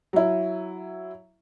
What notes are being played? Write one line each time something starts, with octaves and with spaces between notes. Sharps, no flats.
F#3 E4